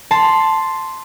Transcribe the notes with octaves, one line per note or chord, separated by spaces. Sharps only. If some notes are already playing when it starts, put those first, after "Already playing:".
A5 C6